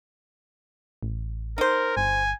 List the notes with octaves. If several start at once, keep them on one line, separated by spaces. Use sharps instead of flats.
A1
D#4 A#4 C5
G1 G#5